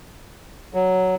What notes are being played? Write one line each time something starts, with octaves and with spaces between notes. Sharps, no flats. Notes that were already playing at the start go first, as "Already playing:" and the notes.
F#3